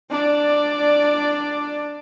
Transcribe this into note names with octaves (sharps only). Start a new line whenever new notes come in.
D4 D5